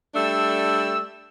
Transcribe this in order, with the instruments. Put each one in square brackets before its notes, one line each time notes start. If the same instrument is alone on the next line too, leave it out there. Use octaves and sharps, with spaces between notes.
[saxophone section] G3 A3 D4 [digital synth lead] E6